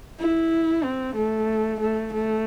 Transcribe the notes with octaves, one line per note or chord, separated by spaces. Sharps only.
E4
C4
A3
A3
A3